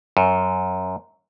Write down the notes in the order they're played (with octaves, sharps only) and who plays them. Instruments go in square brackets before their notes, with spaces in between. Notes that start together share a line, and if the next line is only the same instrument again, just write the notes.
[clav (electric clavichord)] F#2